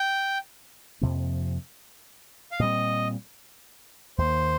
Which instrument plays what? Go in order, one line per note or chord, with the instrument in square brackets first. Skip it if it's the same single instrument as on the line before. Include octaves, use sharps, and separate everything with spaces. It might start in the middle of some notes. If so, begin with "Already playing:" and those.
Already playing: [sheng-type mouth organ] G5
[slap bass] F2 C3 F3 A#3
[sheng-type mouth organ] F5
[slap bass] A#2 G3 C4 [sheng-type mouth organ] D#5
[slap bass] D#2 D#3 A#3 [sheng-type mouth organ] C5